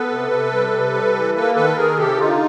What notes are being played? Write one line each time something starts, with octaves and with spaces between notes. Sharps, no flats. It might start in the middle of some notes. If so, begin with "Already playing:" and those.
Already playing: B3 A4 B4
C3
C3
G3
C3
G3
E3
A#3 A4 B4
D#3 A4 B4
D#3 G#4 A#4
C3 G4 A4
D3 D#4 F4